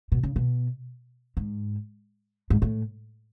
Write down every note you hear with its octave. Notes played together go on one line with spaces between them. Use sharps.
B2
C#3
B2
G#2
G#2
A2